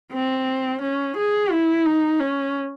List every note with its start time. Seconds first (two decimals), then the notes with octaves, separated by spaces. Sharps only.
0.12 C4
0.82 C#4
1.17 G#4
1.51 E4
1.86 D#4
2.20 C#4